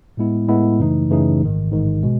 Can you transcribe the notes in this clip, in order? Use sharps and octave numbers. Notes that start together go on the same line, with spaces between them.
A2 G#3 B3 E4
A2 G#3 B3 E4
F#2 C#3 E3 A3 D#4
F#2 C#3 E3 A3 D#4
A1 G#2 D#3
A1 G#2 D#3
B2 G#3